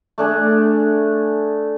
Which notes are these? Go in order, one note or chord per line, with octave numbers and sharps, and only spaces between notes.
A3 D4 G#4